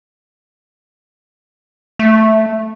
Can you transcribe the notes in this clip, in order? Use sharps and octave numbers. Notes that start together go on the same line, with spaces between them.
A3